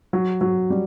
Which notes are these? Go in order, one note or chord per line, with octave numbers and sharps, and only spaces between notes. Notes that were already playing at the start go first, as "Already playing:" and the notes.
F#3
F#3
G3